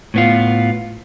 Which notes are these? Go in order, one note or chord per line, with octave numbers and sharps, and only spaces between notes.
A2 B3 F4